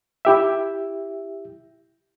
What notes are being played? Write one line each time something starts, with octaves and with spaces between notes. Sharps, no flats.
E4 G4 E5